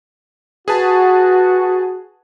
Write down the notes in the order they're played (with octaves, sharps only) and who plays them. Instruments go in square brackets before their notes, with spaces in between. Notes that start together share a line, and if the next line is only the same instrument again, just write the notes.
[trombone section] F#4 [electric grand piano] G#4 B4 A5